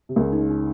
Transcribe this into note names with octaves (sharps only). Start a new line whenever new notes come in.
C3
C#2 C#3 A#4
D#4
D#4